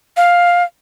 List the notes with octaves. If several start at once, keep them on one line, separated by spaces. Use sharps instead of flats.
F5